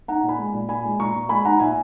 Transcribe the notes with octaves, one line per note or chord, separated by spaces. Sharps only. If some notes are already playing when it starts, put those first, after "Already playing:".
D#4 F#5 A#5
A#2
G#5 B5
G#3
A#2
A#2 G#5 B5
G#3
A#2 A#5 C#6
A#2
G#3 G#5 B5
D#4 F#5 A#5
A#2 E5 G#5